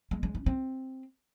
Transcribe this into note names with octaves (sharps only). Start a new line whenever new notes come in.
G#3
G#3
C#4
C4